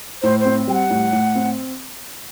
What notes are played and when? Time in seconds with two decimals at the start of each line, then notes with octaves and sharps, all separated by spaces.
0.22 A2 C5
0.40 C5
0.45 C4
0.68 G3 G5
0.74 F#5
0.90 A2
1.13 A2
1.35 C4